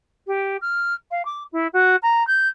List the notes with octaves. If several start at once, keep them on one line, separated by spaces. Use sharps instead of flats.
G4
F6
F5
D6
E4
F#4
A#5
G6